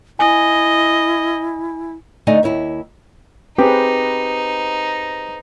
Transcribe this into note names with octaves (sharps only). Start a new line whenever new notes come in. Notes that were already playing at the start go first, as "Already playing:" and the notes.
E4 D#5 G#5
D3 A3 D#4 D5 D#5 G#5
D#2 E4 C#5 E5
C4 D#4 G4 G#4 B4